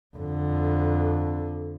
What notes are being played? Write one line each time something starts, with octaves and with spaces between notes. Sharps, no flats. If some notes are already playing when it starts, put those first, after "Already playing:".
F2 D3